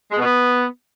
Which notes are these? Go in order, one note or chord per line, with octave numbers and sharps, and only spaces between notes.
G#3
B2
B3